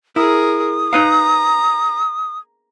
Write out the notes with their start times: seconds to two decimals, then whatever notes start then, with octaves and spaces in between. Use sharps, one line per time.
0.16 E4 G#4 A#4 D#6
0.93 D#4 B4 F5 A#5